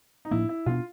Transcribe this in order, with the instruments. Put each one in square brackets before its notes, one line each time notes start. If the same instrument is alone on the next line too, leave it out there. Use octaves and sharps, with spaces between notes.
[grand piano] D#4
[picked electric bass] A2 F3 A#3 D4 [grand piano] E4
[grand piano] E4
[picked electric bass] B2 G3 B3 D4 [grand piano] F4